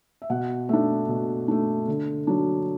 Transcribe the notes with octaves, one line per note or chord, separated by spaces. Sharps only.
E5
B2 F#5
A3 D4 E5
B2
A3 D4
D3
F#3 D4